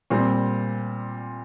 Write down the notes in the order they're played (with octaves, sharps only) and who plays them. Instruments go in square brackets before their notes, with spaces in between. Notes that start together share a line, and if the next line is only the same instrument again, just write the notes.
[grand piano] A#2 G3 C4